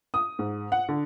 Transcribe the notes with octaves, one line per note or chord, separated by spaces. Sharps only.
D#6
G#2
F#5
D3